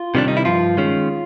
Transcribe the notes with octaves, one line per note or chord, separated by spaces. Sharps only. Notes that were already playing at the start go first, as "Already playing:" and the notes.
Already playing: F4
C3 D#3 G3 D4
D#4
E4
G2 F3 F4
D#3 G#3 C#4